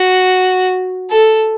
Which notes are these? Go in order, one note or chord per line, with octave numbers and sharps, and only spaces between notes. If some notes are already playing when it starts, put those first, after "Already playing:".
Already playing: F#4
A4